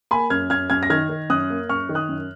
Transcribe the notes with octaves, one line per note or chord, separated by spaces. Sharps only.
A#3 G#5 B5
F#2 F6 G#6
F#2 F6 G#6
F#2 F6 G#6
A#6
D#3 F6 G#6
D#3
F#2 D#6 F#6
A#3
F#2 C#6 F6
D#3
D#6 F#6
F#2